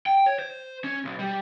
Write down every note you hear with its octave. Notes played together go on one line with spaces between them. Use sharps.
G5
C#5
C5
C#4
B1
G3